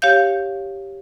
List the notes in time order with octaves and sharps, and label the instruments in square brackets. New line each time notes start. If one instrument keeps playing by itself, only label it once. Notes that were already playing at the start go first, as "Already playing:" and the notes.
[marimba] G4 C#5 F5 G6